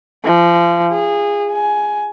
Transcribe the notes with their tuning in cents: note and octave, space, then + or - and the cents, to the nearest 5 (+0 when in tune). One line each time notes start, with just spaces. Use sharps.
F3 -30
G#4 -20
G#5 +15